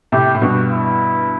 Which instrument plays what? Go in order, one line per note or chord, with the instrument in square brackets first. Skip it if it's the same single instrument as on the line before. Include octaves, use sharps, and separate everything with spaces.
[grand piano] A2 C3 [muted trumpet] G4
[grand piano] A2
[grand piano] G2 B2 [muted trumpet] F#4
[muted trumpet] E4